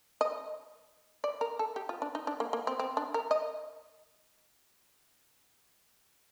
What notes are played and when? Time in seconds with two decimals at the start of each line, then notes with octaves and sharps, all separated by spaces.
0.21 D#5
1.24 D5
1.41 A#4
1.59 A4
1.76 G4
1.89 F4
2.02 D4
2.15 D#4
2.27 D4
2.40 A#3
2.53 A#3
2.67 C4
2.79 C4
2.97 D4
3.14 A#4
3.31 D#5